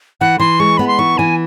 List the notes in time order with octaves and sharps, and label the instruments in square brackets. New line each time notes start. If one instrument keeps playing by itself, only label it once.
[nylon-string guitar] E3 [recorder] F#5
[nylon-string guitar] E3 [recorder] C6
[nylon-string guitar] G#3 [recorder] C#6
[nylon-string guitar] B3 [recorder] B5
[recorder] C6
[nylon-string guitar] E3 [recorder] C#6
[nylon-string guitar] E3 [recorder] G#5